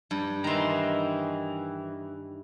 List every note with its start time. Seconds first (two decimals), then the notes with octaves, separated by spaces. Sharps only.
0.11 G2
0.44 D#3 E3 A#5 C6